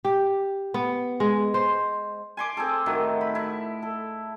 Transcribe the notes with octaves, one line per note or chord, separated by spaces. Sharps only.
G4
B3
G#3
C5
G#5 C6 D6
C4 G#4 A4
A2 D#3 F#3
B5
E4
A4